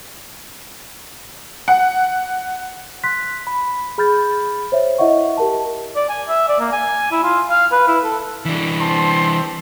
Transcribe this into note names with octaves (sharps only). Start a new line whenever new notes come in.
F#5
C6 F#6 B6
B5
G#4 B5 F6 G6 A6
C5 C#5 E5
E4 D#5 E5 F#5 C#6
G4 A#4 A5
D5
G#5
E5
D5
A#3
G#5
E4
F4
F5
B4
E4
A4
E3 D4
C4 A5 C6